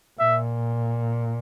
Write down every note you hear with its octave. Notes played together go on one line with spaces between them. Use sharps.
A#2 E5